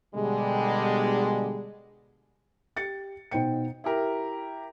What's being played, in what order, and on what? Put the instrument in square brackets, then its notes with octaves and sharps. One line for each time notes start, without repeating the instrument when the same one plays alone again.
[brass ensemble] B2 D3 G3 G#3
[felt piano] G4 A6 C#7
B2 D#4 C5 G5 C#7
[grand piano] E4 G4 A#4